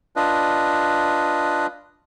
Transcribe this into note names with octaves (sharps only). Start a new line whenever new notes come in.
D4 F4 B4 D#5